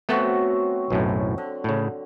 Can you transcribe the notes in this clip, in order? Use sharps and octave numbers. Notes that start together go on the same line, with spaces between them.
F#3 A3 B3 C4 F#4 A4
B1 F#2 A2
D3
A2 C#3